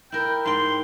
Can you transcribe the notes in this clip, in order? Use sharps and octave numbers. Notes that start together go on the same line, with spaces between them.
E4 A#4 G5
G#2 G5 C6